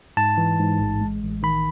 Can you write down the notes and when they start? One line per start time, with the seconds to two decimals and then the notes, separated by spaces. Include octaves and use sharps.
0.17 G#2 A5
0.38 E3
0.60 G#2
0.80 A1
1.01 G#3
1.23 A1
1.43 D#3 B5